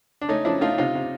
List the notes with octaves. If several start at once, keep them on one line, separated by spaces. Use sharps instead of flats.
D4
A3 C#4 D#4
F3 D4 E4
A3 D#4 F4
C3 D#4 F4
C3